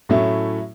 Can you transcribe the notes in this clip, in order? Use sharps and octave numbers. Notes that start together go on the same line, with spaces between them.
A2 F#3 A3 C#4 E4